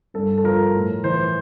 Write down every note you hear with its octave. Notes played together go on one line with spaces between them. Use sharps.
G2 A4
A4
F3 A#4
A2
E3 C5